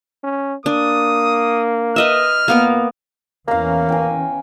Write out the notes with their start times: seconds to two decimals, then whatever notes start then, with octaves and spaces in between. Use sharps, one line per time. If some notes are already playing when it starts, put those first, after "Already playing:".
0.24 C#4
0.66 A#3 D4 D#6
1.96 B4 D#5 E5 F6
2.48 A#2 A#3 B3 A#4
3.48 E2 E3 A#3 C#4 F5 A#5
3.89 G5 G#5